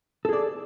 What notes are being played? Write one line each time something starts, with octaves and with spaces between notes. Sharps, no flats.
G#4 A4 D5